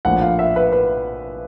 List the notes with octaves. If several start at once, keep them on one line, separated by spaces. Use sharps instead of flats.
A#1 A2 F3 F#5
F5
E5
B4
B4